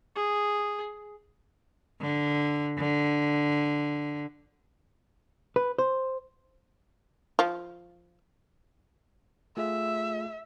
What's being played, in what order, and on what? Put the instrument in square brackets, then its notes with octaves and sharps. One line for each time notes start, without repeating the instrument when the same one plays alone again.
[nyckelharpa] G#4
[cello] D3
D3
[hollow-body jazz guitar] B4
C5
[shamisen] F3 F4
[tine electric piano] A3 F4 G#4 [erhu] E5